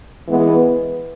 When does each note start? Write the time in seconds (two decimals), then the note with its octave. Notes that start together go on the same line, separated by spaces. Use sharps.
0.28 E3 G#3 B3